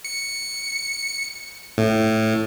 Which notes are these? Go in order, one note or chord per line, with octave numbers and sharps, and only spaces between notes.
C#7
A2